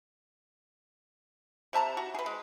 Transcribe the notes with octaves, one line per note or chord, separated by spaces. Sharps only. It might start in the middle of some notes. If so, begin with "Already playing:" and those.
C3 E5 A5 A#5
F#4
G#4 B4
G#3